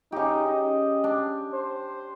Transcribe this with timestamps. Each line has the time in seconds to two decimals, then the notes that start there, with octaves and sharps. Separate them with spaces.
0.12 C#3 D#4 G4
0.47 D#5
1.04 D4
1.54 C5